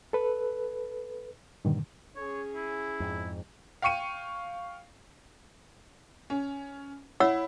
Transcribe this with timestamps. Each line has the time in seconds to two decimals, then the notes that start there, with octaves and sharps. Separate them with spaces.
0.13 A4 B4
1.65 G2 A#2 D3 D#3
2.16 C#4 G#4 C#5
2.56 E4
3.00 F2 G#2
3.82 F5 G5 C#6 C#7 D#7
6.30 C#4
7.20 E4 C#5 F#5 E6